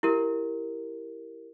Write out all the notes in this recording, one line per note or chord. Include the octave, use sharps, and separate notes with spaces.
E4 G4 A#4